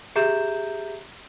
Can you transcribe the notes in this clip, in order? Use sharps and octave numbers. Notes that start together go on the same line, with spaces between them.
G4 G#4 E5 A#5 G6 E7